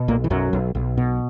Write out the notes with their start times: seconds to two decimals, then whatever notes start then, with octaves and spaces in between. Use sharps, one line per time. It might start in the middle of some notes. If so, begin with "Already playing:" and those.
Already playing: B2
0.08 B1 A#2 A#3
0.24 E3
0.30 B1 F#2 F#3
0.53 B1
0.75 B1
0.98 B2